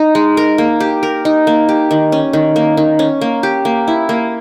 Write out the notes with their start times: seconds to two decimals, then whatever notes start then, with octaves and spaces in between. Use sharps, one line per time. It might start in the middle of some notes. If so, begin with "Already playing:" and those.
Already playing: D#4
0.15 G#3
0.37 A#4
0.58 A#3
0.80 G4
1.03 A#4
1.25 D#4
1.47 A#3
1.69 G4
1.91 D#3
2.12 C#4
2.33 D#3
2.56 A#3
2.77 D#3
2.99 C#4
3.21 A#3
3.43 G4
3.65 A#3
3.88 E4
4.09 A#3